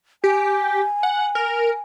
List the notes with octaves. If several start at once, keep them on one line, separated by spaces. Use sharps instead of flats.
G4 G#5
F#5
A#4